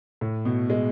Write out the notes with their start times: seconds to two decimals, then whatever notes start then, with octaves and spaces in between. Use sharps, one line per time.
0.21 A2
0.45 B2
0.70 G#3